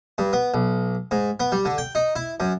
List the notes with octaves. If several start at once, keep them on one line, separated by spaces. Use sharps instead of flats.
G2
B3
B1
G#2
B3
G3
D3
G5
D#4
E4
F#2